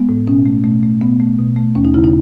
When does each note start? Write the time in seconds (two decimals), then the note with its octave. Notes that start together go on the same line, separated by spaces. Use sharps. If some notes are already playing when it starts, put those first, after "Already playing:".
Already playing: G#3 B3
0.09 A2
0.27 B2 C#4
0.46 A3
0.64 B2 A3
0.83 A3
1.01 B2 B3
1.20 A3
1.38 B2
1.56 A3
1.75 D#2 C#4
1.85 D#4
1.94 C#3 E4
2.04 D#4